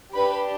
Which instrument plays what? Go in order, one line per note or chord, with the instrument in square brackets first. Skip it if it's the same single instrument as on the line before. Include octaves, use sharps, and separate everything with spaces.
[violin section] D4 G4 B4 B5